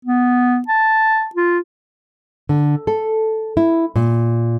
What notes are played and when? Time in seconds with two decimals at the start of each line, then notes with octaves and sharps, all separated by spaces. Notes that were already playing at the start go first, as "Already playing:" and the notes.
0.05 B3
0.68 A5
1.35 F4
2.49 D3
2.87 A4
3.57 E4
3.96 A#2